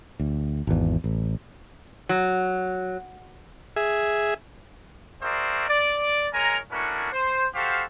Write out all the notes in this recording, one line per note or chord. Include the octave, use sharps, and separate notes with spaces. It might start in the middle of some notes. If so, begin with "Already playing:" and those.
D2
G#1 E2
A1
F#3
G#4 E5
F#4 G#4 A#4 C5 D5 E5
D5
G#3 A#4 C#5 G#5 A#5
A3 C#4 D4 E4 F#4 A#4
C5
F#4 G4 A4 C5 F5